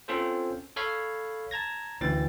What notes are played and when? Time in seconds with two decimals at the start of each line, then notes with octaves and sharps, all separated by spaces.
0.08 C4 C#4 F4 A4 C5
0.76 A4 C#5 F5 B5
1.51 A5 A#5 G#6 A#6
2.01 D2 E3 C#4 G5 A6